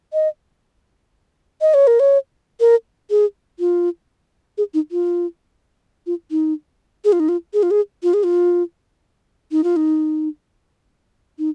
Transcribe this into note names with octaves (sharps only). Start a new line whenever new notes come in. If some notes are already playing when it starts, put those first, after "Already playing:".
D#5
D#5
C#5
A#4
C#5
A#4
G#4
F4
G#4
D#4
F4
F4
D#4
G#4
F4
D#4
F4
G#4
F4
G#4
F4
G#4
F4
D#4
F4
D#4
D#4